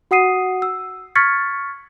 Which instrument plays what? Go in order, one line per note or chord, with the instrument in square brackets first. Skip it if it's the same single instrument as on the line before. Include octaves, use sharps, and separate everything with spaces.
[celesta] F#4 F#5 D#6 C7 D#7
E6
C#6 F6 G#6 A6 B6 C#7